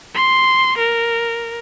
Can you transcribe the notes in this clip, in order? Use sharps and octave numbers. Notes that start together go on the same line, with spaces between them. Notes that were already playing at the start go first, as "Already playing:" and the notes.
C6
A#4